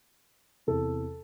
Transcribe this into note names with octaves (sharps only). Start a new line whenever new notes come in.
E2 C3 E3 A4